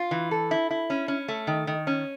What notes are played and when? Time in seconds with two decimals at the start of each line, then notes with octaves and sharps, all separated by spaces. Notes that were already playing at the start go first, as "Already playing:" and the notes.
Already playing: F4
0.11 E3
0.31 A4
0.51 E4
0.70 E4
0.90 C#4
1.08 C#4
1.28 A3
1.47 D#3
1.67 D#3
1.87 C#4